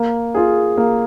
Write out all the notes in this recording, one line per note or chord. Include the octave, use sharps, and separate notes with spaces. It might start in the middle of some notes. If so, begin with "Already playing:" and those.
Already playing: A#3
F4 G#4
A#3